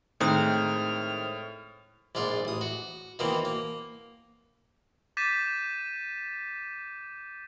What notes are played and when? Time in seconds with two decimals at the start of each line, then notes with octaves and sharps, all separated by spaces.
0.20 A2 D#3 G#3 C4 F6
2.15 A#1 G#2 F4 D5
2.45 A1 D#6
2.61 F#4
3.19 B2 D#3 E3 A#3 C4
3.45 A#3
5.17 D6 G6 A6 B6 D#7 E7